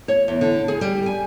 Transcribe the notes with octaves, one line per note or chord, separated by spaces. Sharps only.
C#5
E2
D3
G#4
G3
G#5